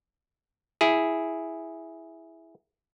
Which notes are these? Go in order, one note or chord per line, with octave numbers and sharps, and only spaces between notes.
E4 G#4